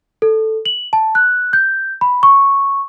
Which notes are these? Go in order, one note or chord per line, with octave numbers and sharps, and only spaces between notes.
A4
F#7
A5
F#6
G6
B5
C#6